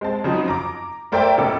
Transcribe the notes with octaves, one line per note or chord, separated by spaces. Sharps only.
G#3 C4 A5
C#3 F3 F#3 C4 D#4
A#5 D6
A3 A#4 C5 D5 E5 G5
B1 A2 C#3 A4 D6